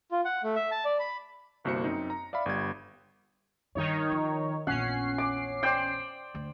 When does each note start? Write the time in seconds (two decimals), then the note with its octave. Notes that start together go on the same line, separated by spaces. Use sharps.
0.11 F4
0.25 F#5
0.43 A3
0.56 E5
0.71 A5
0.85 D5
1.00 B5
1.64 G1 C2 A#3 F#4 C5 C#7
1.84 F#2 C4 D#4
2.10 A#5
2.33 D5 E5 F5 B5
2.46 G1 G3 G#6
3.75 G2 D#3 D#4 C#5
4.11 F3
4.67 A#1 E2 C#4 F#5 C7
5.18 D6
5.63 C5 D5 G5
6.35 D2